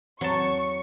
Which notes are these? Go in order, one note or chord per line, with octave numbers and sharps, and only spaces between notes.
E2 F#3 C4 A5 C#6